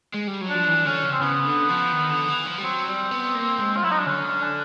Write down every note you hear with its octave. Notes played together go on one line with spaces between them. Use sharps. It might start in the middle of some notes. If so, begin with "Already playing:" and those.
G#3
G3
F#3
D4
F3
E3
D3 C#4
C#3
C4
C#3 B3
D3
F3
D#3
D3
E3
F3
G3
F#3 C4
G3
B3
A#3
G#3
F4
F#3 E4
D#4
D4
D3 C#4
D4